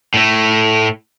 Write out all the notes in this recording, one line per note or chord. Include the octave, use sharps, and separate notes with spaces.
A2 A3